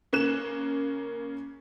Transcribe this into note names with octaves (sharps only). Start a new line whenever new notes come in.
C#3 A#3 F#6 E7